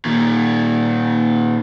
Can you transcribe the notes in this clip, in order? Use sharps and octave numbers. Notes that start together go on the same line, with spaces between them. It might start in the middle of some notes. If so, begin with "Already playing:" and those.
A#2 D#3